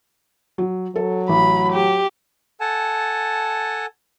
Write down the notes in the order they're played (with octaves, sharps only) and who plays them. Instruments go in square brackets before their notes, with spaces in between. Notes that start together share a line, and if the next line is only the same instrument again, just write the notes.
[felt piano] F#3
[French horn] F#3 [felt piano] A4
[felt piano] A1 [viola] B5
[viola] G4
[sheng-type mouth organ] A4 F#5 G#5 A5